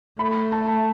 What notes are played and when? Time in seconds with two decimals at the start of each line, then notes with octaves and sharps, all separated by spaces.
0.19 A3 B5
0.52 A5